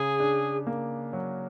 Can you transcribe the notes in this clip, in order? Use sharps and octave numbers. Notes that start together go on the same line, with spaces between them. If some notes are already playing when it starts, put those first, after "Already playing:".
Already playing: C#3 G#4
D4
A#3
F#3